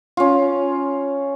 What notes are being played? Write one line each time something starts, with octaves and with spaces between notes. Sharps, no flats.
C#4 F4